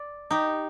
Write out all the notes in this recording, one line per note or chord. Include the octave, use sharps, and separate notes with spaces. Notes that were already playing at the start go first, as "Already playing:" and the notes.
Already playing: D5
D#4 G4